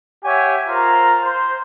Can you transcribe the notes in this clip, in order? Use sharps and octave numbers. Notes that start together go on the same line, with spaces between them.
G4 C#5 E5 F#5 G#5
F4 A#4 C5 A#5
C5